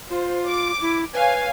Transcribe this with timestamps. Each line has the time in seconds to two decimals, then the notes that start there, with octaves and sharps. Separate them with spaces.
0.10 F4 C5
0.48 D6
0.81 E4
1.14 B4 C#5 F5 G#5